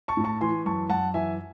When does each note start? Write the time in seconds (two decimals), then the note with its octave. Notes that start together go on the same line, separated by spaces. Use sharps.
0.08 A5 C#6
0.17 A2
0.24 A5 C#6
0.41 E3 G#5 C6
0.66 F#2 A5 C#6
0.90 F#2 F#5 A5
1.14 E3 E5 G#5